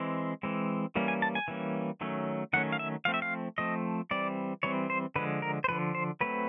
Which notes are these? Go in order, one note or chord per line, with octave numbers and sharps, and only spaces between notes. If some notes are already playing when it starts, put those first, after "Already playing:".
Already playing: E3 G#3 C4
E3 G#3 C4
E3 G3 A#3 C#4
G#5
A5
G#5
E3 G3 A#3 C#4
D#3 F#3 A3 C#4
D#3 F#3 A3 C#4 F#5
F5
E5
F3 A3 C4 F5
E5
F5
F3 A3 C4 D#5
E3 G3 C4 D5
E3 G3 C4 C#5
C5
D3 F3 G#3 B4
A#4
C5
D3 F3 G#3 B4
C5
F#3 A3 C4 B4